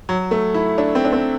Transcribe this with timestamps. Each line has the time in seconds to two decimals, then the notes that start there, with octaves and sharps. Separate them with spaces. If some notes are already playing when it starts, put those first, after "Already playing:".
0.09 F#3
0.31 A3
0.54 E4
0.78 D4
0.95 C4
1.05 D4
1.13 C4